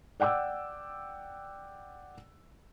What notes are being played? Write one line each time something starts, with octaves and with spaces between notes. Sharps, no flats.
D5 F#5 G5 D6 E6